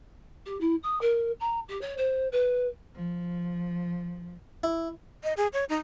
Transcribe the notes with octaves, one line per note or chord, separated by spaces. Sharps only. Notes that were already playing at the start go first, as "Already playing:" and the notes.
G4
E4
D#6
A#4
A#5
G4
C#5
C5
B4
F3
E4
D#5
G#4
C#5
D#4